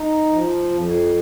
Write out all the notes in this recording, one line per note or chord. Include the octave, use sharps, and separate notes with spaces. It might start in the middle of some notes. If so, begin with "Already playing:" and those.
Already playing: D#4
F3
F2